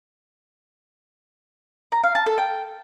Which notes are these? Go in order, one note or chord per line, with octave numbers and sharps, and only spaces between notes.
A#5
F5
A5
A4
G5